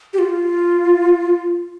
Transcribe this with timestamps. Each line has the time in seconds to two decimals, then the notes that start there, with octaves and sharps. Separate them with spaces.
0.13 G4
0.19 F4